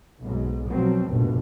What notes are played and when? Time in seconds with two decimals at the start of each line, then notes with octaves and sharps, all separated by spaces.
0.21 B1 G#2
0.67 B2 F3 F#3 C4
1.09 F1 A#1 G2 B2